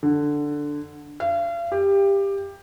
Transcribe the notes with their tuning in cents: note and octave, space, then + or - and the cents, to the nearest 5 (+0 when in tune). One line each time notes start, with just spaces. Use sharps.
D3 +0
F5 -40
G4 +15